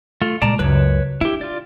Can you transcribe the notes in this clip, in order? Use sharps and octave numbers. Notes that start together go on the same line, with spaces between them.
A3 F4
A#2 G#3 D5 A5 A#5
C#2 F#2 B4 C#5
D4 E4 G4
F4 D5